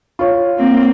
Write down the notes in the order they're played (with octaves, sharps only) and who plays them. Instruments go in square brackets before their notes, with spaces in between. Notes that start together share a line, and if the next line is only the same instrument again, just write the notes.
[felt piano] F4 C#5
[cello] A#3 C4